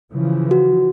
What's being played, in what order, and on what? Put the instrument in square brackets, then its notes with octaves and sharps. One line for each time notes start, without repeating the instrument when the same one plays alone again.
[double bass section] C#3 E3 F3
[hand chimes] F#4